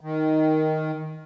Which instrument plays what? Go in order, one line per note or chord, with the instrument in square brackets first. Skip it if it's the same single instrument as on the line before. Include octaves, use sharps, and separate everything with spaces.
[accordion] D#3